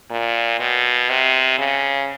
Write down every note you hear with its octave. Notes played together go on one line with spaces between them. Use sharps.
A#2
B2
C3
C#3